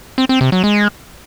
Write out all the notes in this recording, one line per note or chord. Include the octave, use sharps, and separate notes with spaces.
C4
C4
C3
F#3
G#3